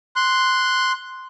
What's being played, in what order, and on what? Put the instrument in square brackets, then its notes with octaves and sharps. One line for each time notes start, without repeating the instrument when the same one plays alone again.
[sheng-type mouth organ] C6 F#6